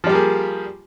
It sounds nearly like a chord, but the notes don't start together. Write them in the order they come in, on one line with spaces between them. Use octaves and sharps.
F3 G3 G4 A#3 G#4